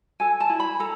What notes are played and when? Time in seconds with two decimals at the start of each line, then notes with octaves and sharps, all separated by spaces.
0.20 A4 G#5
0.40 A5
0.50 E4
0.60 B5
0.80 A4 A#5